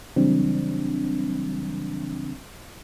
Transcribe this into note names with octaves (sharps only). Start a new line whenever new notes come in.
C#3 E3 F#3 G3 C4 D4